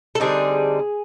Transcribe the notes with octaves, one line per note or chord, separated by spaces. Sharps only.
A4
D3 G3 C4 D#4 G#4